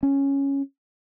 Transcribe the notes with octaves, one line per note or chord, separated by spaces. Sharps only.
C#4